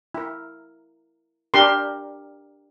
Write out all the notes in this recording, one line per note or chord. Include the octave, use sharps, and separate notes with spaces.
E4 A#4
D4 G4 A#4 C6